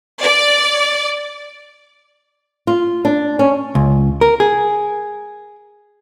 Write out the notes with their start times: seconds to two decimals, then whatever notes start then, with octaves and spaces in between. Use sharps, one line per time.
0.21 D5
2.67 F4
3.05 D4
3.39 C#4
3.75 C#2
4.21 A#4
4.40 G#4